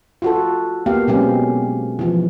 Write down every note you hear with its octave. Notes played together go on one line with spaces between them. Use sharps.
F4 F#4 A4
A#3 B3 G4 F5
B2 F#3 G#3 C4 C#4 G4
E3 F3